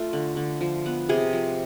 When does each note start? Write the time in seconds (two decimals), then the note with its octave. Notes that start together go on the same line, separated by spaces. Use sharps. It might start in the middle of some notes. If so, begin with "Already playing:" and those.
Already playing: A3 F4
0.13 D3
0.36 D3
0.61 F3
0.86 B3
1.09 C3 G#4
1.33 F3